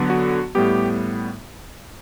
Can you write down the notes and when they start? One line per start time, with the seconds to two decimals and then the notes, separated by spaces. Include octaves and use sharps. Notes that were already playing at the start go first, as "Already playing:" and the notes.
Already playing: D3 F#3 B3
0.10 F#4
0.55 A2 G3 B3 G4